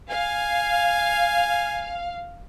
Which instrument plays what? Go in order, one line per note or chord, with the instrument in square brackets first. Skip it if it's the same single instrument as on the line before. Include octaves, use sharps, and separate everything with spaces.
[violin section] F5 [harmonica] G#5